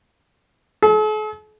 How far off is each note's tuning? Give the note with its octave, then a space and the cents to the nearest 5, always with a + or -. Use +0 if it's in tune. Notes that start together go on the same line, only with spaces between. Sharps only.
A4 -45